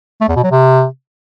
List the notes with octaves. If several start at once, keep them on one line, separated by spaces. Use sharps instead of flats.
A3
E2
B2
F#3
C3